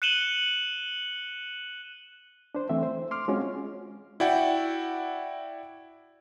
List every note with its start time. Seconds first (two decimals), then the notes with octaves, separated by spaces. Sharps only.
0.02 F#6 C#7 D#7 E7 F#7 G7
2.55 D4 C5
2.69 E3 A3 C4 E5
2.83 C5
3.11 C6 D6 F6
3.28 G#3 C4 C#4 F4 F#4
4.20 E4 F#4 D5 F#5 G5